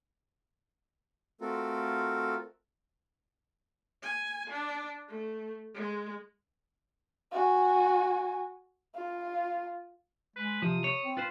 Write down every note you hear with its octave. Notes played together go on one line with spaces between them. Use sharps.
A3 C4 F4 F#4 A4 A#4
G#5
D4
A3
G#3
F#4 G#5
F4
G#3 B4
C3 F3 D#6
C#5
C4
F4 B4 C5